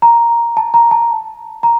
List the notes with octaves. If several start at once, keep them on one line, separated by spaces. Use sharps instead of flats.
A#5
A5
A#5
A5
A#5